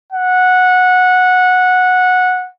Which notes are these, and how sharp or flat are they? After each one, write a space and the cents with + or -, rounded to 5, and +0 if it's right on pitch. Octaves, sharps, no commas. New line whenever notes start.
F#5 -15